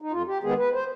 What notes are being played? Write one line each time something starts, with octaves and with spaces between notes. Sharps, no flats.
D#4
F2 F4
G4
D#3 G#3 B3 G#4
B4
C5